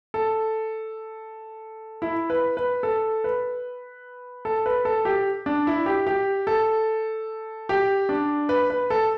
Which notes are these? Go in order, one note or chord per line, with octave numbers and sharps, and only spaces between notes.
A4
E4
B4
B4
A4
B4
A4
B4
A4
G4
D4
E4
G4
G4
A4
G4
D4
B4
B4
A4